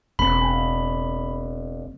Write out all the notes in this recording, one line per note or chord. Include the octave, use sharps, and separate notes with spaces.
E1 C#3 A#3 C4 B5